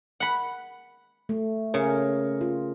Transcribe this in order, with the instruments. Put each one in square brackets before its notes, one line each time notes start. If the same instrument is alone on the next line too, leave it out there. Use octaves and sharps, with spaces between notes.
[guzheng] F#5 B5
[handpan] A3
[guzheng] C#3 [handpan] A#4
[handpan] F4